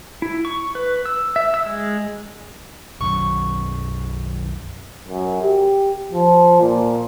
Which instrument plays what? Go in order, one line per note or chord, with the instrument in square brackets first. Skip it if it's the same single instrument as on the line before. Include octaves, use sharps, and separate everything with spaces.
[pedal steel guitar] E4
C#6
B4
E6
E5
E6
G#3
[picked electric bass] B1 F#2 [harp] C#6
[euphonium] F#2
G4
F3
A#2